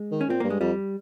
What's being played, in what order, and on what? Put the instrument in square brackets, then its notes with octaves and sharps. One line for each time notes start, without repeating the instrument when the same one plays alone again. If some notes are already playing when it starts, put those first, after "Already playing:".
Already playing: [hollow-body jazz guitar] G#3
[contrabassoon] D#3
[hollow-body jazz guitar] C#4
[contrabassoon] A#2 [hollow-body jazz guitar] C4
[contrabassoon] G2 [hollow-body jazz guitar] A#3
[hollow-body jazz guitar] G#3
[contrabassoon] F2 [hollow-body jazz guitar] G3